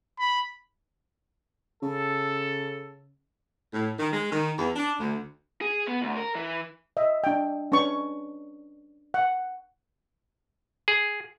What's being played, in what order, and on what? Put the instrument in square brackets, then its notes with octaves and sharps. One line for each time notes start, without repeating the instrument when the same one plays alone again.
[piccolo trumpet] B5
[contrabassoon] C#3 [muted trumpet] A4
[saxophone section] A2
D#3
G#3
D#3
E2
D4
D2
[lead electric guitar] G#4
B3
D2
A#4
E3
[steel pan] D#5 E5
D4 G5
C#4 D4 B4 C#6
F#5
[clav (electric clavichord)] G#4